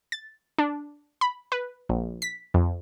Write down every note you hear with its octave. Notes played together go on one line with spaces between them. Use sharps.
A6
D4
B5
B4
A#1
B6
F2